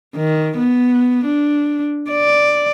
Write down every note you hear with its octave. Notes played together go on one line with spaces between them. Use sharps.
D#3
B3
D4
D5